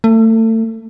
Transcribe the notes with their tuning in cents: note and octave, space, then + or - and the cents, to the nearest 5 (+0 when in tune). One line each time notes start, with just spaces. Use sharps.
A3 +30